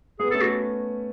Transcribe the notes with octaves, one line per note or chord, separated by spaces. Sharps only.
B3 G#4
A4
A3 C#4
F#4